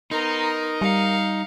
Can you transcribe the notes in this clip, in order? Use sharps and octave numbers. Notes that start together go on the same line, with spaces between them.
B3 D#4 A#4 C6
G3 F5 C#7